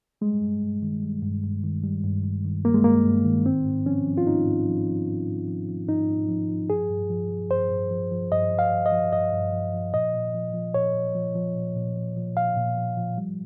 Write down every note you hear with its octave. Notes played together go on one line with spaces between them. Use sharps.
G3 G#3
G2
G2
D#3
G3
G2
G2
D#3
G3
G2
G2
D#3
G3 A#3
G#3
G2 A#3
G2
D#3
G#2 C4
G#2
F3 C#4
F3
F4
G#2 D#4
G#2
F3
F3
G#2
G#2
F3
F3
G#2 D#4
G#2
F3
F3
G2 G#4
G2
F3
F3
G2 C5
G2
F3
F3
G2 D#5
G2
F5
F3
D#5
F3
G2 D#5
G2
F3
F3
A#2 D#5
A#2
F3
F3
A#2 C#5
A#2
F3
F3
A#2
A#2
F3
F3
A#2 F5
A#2
F3
F3
G3